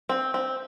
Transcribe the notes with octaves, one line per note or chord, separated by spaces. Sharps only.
C4
C4